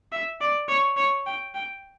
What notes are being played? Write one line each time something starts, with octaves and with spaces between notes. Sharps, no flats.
E5
D5
C#5
C#5
G5
G5